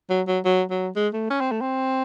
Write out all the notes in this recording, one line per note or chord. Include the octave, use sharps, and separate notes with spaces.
F#3
F#3
F#3
F#3
G#3
A3
C#4
C4
A3
C4